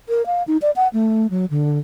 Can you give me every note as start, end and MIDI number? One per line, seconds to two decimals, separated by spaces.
0.08 0.25 70
0.26 0.43 77
0.47 0.57 63
0.62 0.71 74
0.76 0.88 78
0.93 1.27 57
1.30 1.46 54
1.50 1.79 50